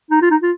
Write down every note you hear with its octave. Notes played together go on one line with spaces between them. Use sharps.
D#4
F4
D#4
F4